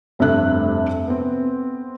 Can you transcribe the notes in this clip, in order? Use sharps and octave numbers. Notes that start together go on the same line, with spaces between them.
F1 G2 C3 A3 E5 F#6
B3 C4